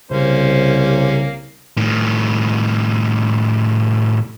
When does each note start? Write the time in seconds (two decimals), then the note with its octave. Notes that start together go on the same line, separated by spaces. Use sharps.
0.11 C2 C#3 A#3 C#4 C5
1.77 A2 D#3